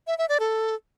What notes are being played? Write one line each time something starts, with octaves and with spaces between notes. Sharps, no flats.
E5
E5
D5
A4